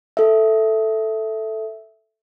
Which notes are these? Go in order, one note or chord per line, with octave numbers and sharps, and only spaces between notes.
A4 E5